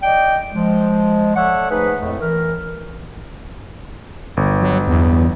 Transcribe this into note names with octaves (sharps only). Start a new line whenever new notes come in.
D5 D#5 G5
F3 G#3
A4 C#5 D5 E5 F#5
F3 A3 D#4 G#4 B4
F2 A2 G#3 A3
E3 A#4
G1
F#3
E2